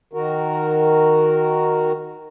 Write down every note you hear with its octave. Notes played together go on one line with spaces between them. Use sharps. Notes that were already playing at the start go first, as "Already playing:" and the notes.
D#3 F#4 A#4